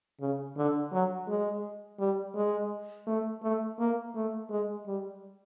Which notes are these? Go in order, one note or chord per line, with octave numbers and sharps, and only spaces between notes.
C#3
D3
F#3
G#3
G3
G#3
A3
A3
A#3
A3
G#3
G3